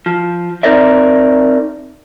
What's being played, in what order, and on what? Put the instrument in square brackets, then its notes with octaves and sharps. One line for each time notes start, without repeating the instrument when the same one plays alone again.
[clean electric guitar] F3
C4 D#4 A#4 D5 E5